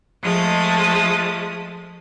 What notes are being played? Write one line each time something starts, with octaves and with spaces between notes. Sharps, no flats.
F3 G#3 A3 D#6